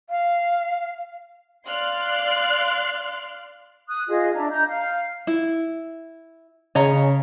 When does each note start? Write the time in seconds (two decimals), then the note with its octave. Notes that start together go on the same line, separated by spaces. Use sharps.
0.09 F5
1.67 D5 F5 C6 F6 F#6 C7
3.88 D#6 F#6
4.08 F4 G#4 D#5
4.35 D4 E5 A#5
4.50 D#5 A#5 G6
4.68 F5
5.27 E4
6.75 C#3 C#5 D#5 A#5